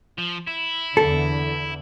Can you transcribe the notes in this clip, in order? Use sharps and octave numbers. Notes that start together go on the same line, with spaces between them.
F3
E4
E2 D3 A4